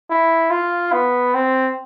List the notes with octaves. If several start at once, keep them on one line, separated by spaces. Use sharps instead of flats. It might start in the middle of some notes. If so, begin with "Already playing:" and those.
E4
F4
B3
C4